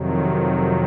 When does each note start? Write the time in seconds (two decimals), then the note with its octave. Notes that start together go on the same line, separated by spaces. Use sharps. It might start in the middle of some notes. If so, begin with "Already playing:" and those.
Already playing: F2 C3 D#3 F#3